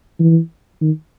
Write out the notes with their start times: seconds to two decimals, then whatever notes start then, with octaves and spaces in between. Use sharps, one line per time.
0.20 E3
0.81 D#3